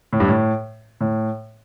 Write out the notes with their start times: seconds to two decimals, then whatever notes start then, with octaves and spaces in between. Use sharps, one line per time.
0.13 A2
0.20 G2
0.28 A2
1.01 A2